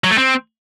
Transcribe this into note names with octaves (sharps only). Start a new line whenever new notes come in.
F#3
A3
C4